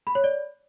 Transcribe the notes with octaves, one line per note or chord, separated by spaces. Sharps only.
B5
C#5
D5